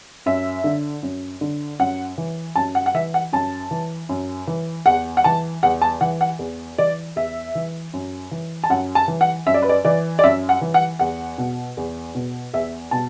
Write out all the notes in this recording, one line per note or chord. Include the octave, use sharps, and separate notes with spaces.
F#2 E5
D3
F#2
D3
F#2 F#5
E3
F#2 A5
F#5
F#5
E3 E5
F#5
F#2 A5
E3
F#2
E3
E2 F#5
F#5
E3 A5
E2 F#5
A5
E3 F#5
F#5
E2
E3 D5
E2 E5
E3
F#2
E3
A5
F#2 F#5
A5
E3
F#5
F#2 E5
D5
B4
D5
E3 D5
D5
F#2 E5
F#5
E3
F#5
E2 F#5
B2
E2
B2
E2 E5
B2 A5